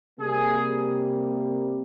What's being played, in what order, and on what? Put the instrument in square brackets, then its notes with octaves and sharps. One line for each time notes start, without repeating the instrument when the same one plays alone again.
[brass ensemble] C3 G3 A#3 G#4